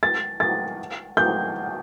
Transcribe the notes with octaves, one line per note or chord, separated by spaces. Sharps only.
A6
A6
G6